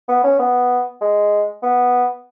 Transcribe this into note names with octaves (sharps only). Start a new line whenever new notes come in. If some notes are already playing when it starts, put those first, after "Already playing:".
B3
C#4
B3
G#3
B3